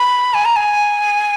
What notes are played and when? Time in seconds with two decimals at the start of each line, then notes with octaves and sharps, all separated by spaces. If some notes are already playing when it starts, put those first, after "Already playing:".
Already playing: B5
0.34 G#5
0.45 A#5
0.56 G#5